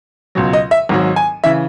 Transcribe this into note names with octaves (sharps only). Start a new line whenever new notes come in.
C#2 B2 F#3
D#5
E5
G#1 G#2 F#3
G#5
C#3 E3 E5